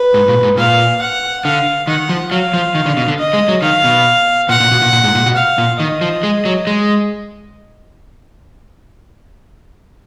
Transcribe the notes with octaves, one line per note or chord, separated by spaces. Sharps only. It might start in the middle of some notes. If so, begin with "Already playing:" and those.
Already playing: B4
G#2
A#2
G#2
A#2 F5
F#5
D3 F5
D#3 F#5
F3
F#3 F5
F3
D#3
D3
B2
D3
D#5
G#3
F#3
D#3 F5
B2
A#2 F#5
A#2
B2
A#2
A#2
G#2
A#2
B2
F5
A#2
D#3 D#5
F3
G#3
F#3
G#3